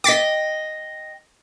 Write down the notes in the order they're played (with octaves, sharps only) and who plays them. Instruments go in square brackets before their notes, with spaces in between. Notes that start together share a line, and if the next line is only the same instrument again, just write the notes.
[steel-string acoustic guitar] D#5 G5 [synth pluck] D6 A6 B6